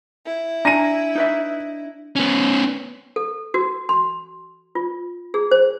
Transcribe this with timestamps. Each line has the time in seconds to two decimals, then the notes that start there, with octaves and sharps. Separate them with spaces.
0.25 E4
0.65 D4 G#5 A#5 A#6 D#7
1.16 D#4 B4 E5
2.16 B3 C#4
3.16 A4
3.54 F#4
3.89 C6
4.75 F4
5.34 G#4
5.51 C5